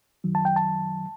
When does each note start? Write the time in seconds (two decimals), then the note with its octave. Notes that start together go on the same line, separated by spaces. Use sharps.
0.24 F#2 D#3 F#3
0.35 A5
0.45 G5
0.56 A5